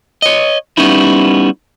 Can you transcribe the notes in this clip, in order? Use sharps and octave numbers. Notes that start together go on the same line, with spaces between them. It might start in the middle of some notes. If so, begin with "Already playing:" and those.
C#5 D#5
G3 B3 C#4 D#4 E4